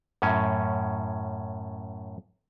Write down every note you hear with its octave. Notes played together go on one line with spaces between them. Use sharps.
F#2 A2 C#4